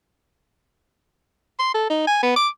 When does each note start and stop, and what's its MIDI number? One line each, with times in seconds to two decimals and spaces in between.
1.59 1.71 84
1.74 1.87 69
1.90 2.04 63
2.07 2.19 80
2.23 2.36 59
2.36 2.48 86